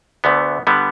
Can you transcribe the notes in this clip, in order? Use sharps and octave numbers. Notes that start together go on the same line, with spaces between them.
D2 D3 A3 B3
D3 G3 B3